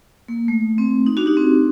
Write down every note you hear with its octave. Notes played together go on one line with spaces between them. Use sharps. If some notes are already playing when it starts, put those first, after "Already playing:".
A#3
A3
C4
D#4
D4 F#4
D#4 G4
C4